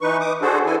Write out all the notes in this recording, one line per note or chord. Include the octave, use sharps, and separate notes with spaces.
E3 D#4 B4 C#6
D6 D#6
D4 F#4 G#4 A4 C5
E3 E4 A4 G#5